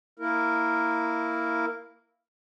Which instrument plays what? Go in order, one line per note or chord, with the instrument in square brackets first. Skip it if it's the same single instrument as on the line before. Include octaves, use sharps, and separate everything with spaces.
[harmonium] A#3 E4 A#4